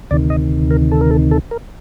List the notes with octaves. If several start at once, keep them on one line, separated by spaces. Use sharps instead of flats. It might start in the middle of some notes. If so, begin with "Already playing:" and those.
D2 C3 D#3 D5
D#5
A#4
A4
A#4
A4
A4
A#4